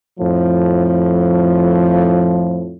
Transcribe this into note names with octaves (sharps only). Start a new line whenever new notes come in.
F2 A2 F3